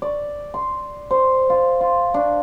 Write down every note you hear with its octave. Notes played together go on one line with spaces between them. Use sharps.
D5
C6
C5
F4
F4
D4